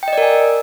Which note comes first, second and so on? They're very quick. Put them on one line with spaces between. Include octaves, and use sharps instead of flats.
G5 D#5 D5 A#4 G#5